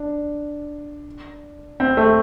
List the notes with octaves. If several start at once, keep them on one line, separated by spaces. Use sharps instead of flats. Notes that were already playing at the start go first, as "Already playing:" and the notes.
Already playing: D4
C4
A3